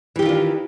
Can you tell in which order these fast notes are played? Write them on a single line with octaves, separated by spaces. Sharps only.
E3 G4 D#3 F4 D4